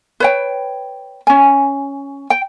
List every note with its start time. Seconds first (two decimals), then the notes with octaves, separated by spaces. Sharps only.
0.20 B4 C#5 G5
1.27 C#4 G#5
2.30 G5